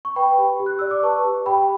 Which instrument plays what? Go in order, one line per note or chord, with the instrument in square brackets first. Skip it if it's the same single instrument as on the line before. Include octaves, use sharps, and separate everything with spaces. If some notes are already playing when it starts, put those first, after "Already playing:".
[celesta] C#6
B4 G5 B5
G4
G4
F#6
D5 E6
D6
B4 A5 C#6
G4
G4 G5 B5